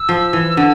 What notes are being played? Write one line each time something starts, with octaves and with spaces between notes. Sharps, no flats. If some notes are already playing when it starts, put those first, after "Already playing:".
Already playing: E6
F3
E3
D3